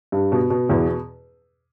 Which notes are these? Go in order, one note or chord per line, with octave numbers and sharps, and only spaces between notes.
G2
B2
B2
E2